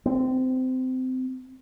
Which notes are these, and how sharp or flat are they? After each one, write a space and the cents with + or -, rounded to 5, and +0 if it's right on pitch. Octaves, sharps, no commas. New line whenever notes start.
C4 -25